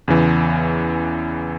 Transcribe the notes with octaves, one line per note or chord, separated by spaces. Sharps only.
E2 C#3 E3